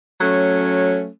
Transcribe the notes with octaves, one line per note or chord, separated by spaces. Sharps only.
F#3 A3 C#4